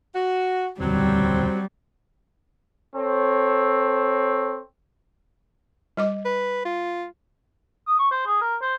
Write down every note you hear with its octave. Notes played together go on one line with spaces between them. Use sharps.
F#4
E1 D2 F#3 G3 C4
C4 A4 C#5
G3 D#5 D6
B4
F4
D#6
C#6
C5
G#4
A#4
C5